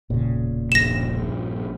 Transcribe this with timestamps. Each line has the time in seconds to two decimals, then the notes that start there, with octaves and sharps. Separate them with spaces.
0.10 E1 A#2 C#3
0.72 A#1 G2 A#6 E7